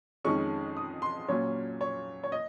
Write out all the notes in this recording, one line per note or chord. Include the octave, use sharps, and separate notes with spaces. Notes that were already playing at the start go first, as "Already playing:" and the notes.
F2 D#3 G#3 C#4 C#6
D#6
C6
A#2 F#3 C#4 C#5
C#5
C#5
D#5